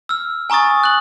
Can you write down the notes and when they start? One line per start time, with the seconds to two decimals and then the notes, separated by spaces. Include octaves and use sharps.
0.09 E6 F6
0.50 G#5 A#5 C#6 D#6 A6
0.84 F#6 F#7